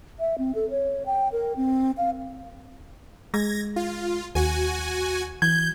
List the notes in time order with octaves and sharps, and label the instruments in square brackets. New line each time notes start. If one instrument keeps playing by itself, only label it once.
[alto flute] E5
C4
A4
C#5
G5
A#4
C4
F5
[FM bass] G#3 [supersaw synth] G#6 A#6
[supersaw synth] F4
[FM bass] D#2 [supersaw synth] F#4 G#5
[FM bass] E3 [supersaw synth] G6 [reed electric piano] G#6